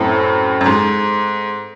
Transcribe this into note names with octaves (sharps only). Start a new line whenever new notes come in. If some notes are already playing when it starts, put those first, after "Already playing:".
Already playing: F#2 A2 A3 C4 E4
F#2
G#2